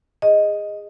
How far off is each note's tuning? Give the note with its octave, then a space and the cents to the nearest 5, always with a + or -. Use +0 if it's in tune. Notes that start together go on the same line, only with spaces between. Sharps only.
G#4 -20 D#5 +0